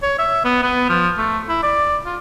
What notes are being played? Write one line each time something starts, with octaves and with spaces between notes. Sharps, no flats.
C#5
E5
B3
B3
F3
A3
E4
D5
F4